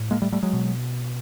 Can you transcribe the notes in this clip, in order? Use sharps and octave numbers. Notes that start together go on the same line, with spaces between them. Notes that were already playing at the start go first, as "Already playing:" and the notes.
Already playing: A2
G#3 A#3
G3 A3
G3 A3
F#3 G#3
B2